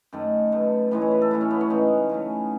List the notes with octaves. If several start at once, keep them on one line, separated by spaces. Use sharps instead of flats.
F#2 D#3 A3
B2 A3
A2 E3 G#3 B4
C#5
B4
A4
A2 F#3 A3 E4
C#4
B3
C#4
C#3 E3 G#3 D#4
C#3 F#3 A3